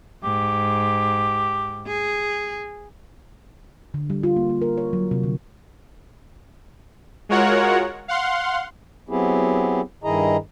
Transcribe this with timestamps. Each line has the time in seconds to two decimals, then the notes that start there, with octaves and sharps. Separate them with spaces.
0.24 G#2 G4
1.87 G#4
3.94 D3
4.10 G3
4.23 F4
4.36 A#3
4.50 A#3
4.62 A#4
4.78 C#5
4.93 F#3
5.11 C3
5.23 D3
7.29 G#3 F4 F#4 A#4 C#5 F#5
8.08 F5 F#5 C6
9.09 F#3 B3 C4 E4 G4 G#4
10.04 G2 D#3 E4 G#4 D#5 A#5